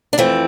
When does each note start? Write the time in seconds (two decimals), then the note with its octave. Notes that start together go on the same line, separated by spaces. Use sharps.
0.13 D4
0.18 F2 E3 A3 C4